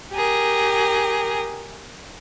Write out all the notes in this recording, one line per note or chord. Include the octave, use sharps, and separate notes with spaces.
G4 G#4 A#4